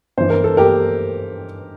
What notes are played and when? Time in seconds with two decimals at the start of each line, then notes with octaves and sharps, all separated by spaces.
0.17 G2 E3 C5
0.30 A#4
0.44 A4
0.57 G4 A#4